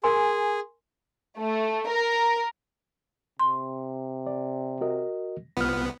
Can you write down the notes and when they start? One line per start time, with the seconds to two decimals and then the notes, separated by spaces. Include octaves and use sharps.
0.04 G#4 A#4 G#5 C6
1.39 A3
1.88 A#4
3.40 C3 C6
4.27 D5
4.81 F#4 A#4 D#5
5.57 C2 B3 F4 F6